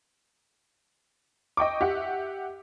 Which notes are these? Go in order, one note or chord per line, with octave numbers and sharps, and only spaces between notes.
D#5 G5 C#6 D6
G4 E5 F#5